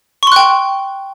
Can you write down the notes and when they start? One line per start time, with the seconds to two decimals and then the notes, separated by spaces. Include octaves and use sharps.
0.23 C#6
0.27 C6
0.32 F#6
0.36 G5